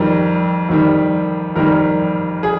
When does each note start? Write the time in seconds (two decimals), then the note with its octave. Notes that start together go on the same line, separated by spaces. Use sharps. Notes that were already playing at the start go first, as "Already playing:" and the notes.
Already playing: F2 D#3 G3 A#4
0.69 F2 D#3 G3
1.56 F2 D#3 G3 A#4
2.43 G#4